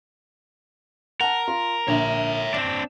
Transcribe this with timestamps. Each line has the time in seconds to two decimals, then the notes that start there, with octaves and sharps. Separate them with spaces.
1.21 A#4 F#5 A5
1.48 F4
1.88 A#1 D3 C#5 E5
2.54 C4 D4 E7